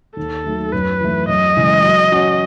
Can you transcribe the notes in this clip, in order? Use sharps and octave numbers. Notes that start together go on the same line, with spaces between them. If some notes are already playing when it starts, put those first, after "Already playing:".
D#2 A4
D#3 F#3 A3
F#2 B4
E3 A3
F#2 D#5
C#3 E3 G#3
F#3
C#4 F#4 C#5